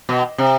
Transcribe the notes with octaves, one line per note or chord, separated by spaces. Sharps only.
B2
C3